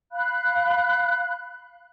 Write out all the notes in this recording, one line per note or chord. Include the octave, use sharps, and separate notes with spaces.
F5 B5 F#6